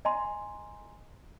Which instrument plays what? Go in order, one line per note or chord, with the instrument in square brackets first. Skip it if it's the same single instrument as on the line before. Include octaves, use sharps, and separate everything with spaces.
[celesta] D#5 G#5 A#5 C6